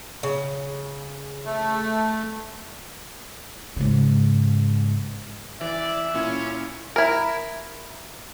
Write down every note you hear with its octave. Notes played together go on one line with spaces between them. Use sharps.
C#3
A3
G#2 C#3
E3 D5 E5
A#2 C#4 E4
E4 A#4